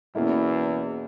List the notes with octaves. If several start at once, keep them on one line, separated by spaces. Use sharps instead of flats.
E2 B2 A#3 C#4 E4